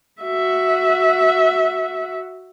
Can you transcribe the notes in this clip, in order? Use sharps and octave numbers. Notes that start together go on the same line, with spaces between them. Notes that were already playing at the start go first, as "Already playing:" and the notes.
F#4 E5